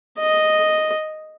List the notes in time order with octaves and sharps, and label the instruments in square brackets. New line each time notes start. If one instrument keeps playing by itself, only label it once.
[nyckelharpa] D#5